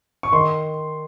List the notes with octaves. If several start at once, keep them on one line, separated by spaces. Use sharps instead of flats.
C#6
D#3 C6